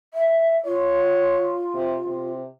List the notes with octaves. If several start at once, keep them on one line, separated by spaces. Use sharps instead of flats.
E5
F4 C#5
C3
C3